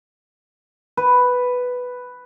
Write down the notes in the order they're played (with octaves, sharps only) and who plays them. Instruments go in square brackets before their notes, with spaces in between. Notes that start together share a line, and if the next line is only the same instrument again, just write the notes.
[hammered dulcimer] B4